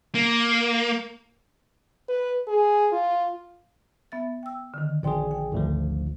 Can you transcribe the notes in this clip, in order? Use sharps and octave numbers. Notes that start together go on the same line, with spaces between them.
A#3
B4
G#4
F4
B3 E5 A6
G5 E6
D3 D#3
A#1 G#4 D5 G5 C6
G5
G#1 D2 F3